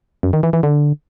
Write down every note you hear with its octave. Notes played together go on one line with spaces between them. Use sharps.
F#2
D#3
E3
E3
D3